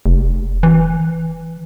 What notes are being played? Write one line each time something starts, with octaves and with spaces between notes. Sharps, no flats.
F1
E3